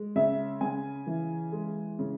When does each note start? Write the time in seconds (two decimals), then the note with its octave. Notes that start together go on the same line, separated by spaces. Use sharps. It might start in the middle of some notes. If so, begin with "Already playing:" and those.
Already playing: G#3
0.16 C#3 E5
0.61 C#3 G#5
1.07 E3
1.52 G#3
1.99 C#3